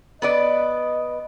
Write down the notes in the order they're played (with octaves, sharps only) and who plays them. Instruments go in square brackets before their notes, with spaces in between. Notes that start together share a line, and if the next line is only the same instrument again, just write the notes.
[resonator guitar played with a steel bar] B3 B4 D5 [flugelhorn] D#5